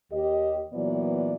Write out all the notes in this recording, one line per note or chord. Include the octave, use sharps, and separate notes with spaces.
D#2 G4 D#5
A#2 E3 F#3 B3 D5